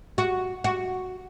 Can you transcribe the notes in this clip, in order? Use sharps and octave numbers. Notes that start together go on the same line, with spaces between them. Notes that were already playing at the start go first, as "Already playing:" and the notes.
F#4
F#4